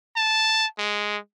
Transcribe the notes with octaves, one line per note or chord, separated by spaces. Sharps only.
A5
G#3